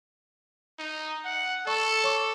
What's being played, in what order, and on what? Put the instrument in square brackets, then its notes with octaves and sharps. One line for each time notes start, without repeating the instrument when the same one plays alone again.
[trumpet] D#4
F#5
[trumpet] A4 [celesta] D5 A5 C#6
[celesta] C#5 C#6 D6